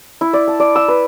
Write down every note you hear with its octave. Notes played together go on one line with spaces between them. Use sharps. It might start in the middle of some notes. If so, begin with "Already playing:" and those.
E4
D5
A5
D5
E6
B4